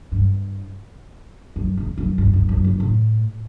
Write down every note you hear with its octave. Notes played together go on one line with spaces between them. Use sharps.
G2
F#2
E2
F#2
G2
F#2
F#2
F#2
A2